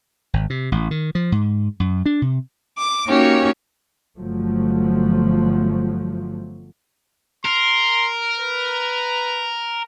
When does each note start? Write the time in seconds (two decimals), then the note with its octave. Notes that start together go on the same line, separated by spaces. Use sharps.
0.33 G#1
0.50 C3
0.72 A1
0.91 D#3
1.15 F3
1.32 G#2
1.80 F#2
2.06 D4
2.22 C3
2.76 D6
3.07 A#3 C#4 D#4 F#4 G4 C#5
4.17 G1 F3 F#3 A3
7.45 A#4 C6
8.39 B4